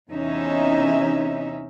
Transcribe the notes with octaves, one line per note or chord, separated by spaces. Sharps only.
E2 C3 C#4 D#4 E5